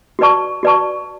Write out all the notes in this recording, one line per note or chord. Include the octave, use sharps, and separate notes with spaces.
F#4 B4 D5 A5 C#6
F#4 B4 D5 A5 C#6